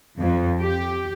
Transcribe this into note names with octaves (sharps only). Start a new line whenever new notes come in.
F2
G4